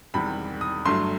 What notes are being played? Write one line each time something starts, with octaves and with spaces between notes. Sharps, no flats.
E1 E2 C3 D#3 G3 B5
D#6
G1 G2 F#3 A3 C6